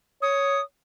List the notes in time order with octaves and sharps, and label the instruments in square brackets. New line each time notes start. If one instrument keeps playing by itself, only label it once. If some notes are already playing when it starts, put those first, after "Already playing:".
[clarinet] C#5 [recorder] D#6